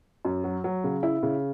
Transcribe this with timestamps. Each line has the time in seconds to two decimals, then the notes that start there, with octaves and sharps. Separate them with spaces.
0.25 F#2
0.44 F#3
0.64 F#3
0.84 C#3
1.03 E4
1.23 C#3